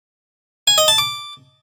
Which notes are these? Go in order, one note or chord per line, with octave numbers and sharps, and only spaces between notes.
G#5
D#5
A5
D6